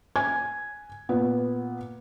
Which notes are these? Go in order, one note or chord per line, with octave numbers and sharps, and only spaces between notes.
G#5 G#6
A#2 B3